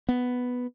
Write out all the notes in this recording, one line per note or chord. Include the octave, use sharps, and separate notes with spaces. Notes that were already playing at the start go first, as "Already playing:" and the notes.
B3